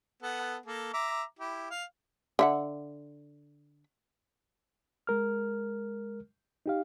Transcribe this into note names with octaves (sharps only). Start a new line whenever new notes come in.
B3 A4 F#5
A#3 A4
E5 A#5 D6
E4 G4
F5
D3 E5 F#5
G#3 A#4 F6
D#4 G4 F5